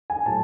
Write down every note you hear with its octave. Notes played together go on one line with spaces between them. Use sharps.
G#5
A2 F#3 A5